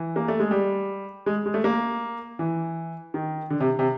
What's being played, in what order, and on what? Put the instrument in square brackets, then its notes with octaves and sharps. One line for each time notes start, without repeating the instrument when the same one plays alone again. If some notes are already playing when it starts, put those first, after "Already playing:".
Already playing: [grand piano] E3
A#3
A3
G#3
G3
G#3
G#3
A3
A#3
E3
D#3
D3
C3
C3